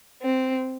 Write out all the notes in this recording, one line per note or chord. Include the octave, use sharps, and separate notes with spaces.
C4